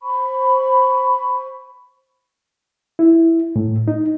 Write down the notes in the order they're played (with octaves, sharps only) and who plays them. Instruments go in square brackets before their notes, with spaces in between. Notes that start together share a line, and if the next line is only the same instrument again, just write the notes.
[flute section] C5 B5 C#6
[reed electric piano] E4
A2
D#4